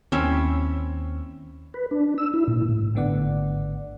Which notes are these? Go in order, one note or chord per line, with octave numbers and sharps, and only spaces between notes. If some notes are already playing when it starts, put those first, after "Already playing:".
D#2 C4 C#4 E4
B4
D4
E6
E4
A#2
A2
G#1 A2 D3 B3 D5 F#5